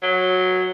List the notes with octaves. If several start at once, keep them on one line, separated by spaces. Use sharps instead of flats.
F#3